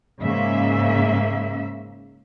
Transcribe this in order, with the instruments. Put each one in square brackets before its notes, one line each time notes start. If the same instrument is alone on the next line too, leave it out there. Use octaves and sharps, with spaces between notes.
[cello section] G#2 C#3 A#3 E5